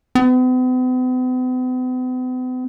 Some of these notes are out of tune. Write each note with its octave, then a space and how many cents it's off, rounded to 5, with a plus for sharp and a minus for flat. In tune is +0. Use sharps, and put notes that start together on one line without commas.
B3 +45